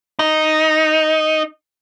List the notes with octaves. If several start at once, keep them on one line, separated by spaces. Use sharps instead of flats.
D#4